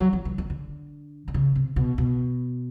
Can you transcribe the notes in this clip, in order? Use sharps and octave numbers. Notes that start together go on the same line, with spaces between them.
F#3
F3
E3
D#3
D3
D3
C#3
C3
B2
B2